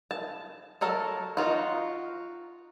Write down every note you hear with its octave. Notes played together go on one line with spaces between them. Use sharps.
A5
F#3 A4 A#4 A5
D#4 F4 F#4